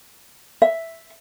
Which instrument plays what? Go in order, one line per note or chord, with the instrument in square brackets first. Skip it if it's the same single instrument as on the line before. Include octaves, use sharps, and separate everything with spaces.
[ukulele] E5